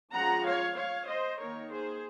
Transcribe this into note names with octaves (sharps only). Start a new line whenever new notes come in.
F3 G#3 C#4 F4 F#5 A#5
C#5 F5
C#5 F5
C5 D#5
D#3 A#3 D#4 A#4 C#5
G#4 C5